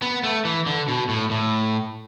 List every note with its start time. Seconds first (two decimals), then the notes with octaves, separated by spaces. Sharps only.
0.02 B3
0.23 A3
0.45 E3
0.66 D3
0.88 B2
1.09 A2
1.31 A2